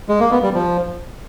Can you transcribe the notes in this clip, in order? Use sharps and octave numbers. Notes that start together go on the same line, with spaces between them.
G#3
A#3
B3
G3
F3